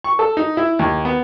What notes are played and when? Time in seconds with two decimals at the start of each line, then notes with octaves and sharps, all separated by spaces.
0.04 C#6
0.19 A4
0.37 D#4
0.57 E4
0.79 D#2
1.05 B3